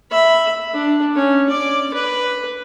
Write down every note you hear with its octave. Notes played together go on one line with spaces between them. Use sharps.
E5 B5
D4
C#4
D5 D6
B4